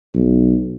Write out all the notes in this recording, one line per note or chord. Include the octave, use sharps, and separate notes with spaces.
B1